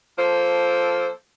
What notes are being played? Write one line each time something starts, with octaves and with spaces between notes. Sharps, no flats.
F3 A#3 A4 C5